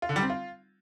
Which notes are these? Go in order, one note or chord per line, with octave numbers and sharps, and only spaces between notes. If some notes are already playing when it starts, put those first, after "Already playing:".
F4
D3
G3
C4
F4